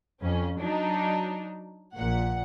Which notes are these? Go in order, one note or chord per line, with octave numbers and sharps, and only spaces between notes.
F2 C#4
F#3 D4 D#4
A#1 A#2 F#5